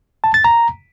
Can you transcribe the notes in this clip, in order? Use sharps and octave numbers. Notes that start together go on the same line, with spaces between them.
A5
A6
A#5